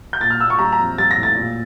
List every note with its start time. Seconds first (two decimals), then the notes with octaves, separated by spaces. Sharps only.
0.13 G6
0.20 A#2 A6
0.30 F6
0.40 A#2 E6
0.50 C#6
0.59 G3 A#5
0.73 A#5
0.79 F2
0.98 G3 A6
1.11 A#6
1.17 A2
1.23 A6
1.36 A#2